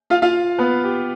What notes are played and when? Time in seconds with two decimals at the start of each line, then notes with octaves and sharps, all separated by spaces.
0.10 F4 F5
0.22 F4 F5
0.58 B3 B4
0.84 G4